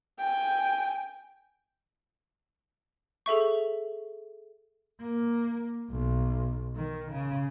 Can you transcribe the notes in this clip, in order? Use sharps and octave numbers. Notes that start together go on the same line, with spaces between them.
G5 G#5
G#4 A4 E5 C#6
A#3
B1
D#3
C#3